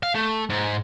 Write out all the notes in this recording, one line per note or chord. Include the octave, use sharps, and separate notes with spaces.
F5
A3
G#2